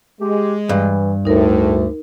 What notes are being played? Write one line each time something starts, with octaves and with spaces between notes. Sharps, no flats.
G#3 G4
G2 E3
D2 A2 D#4 A#4